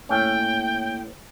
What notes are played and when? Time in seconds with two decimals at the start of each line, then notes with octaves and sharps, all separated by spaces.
0.09 A2 A#3 C#4 G5